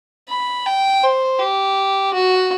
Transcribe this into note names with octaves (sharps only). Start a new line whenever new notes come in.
B5
G5
C5
G4
F#4